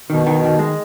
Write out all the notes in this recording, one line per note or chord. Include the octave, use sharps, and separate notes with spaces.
B2 D#3
D#3
D#3
G#3